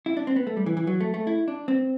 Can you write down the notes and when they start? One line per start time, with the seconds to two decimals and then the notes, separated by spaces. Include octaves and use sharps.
0.06 E4
0.17 D4
0.27 C4
0.36 B3
0.47 A3
0.57 G3
0.66 E3
0.77 E3
0.87 F#3
1.00 A3
1.14 A3
1.27 E4
1.48 D4
1.68 C4